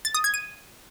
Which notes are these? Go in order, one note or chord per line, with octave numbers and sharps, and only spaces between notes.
A6
D#6
G#6
D#7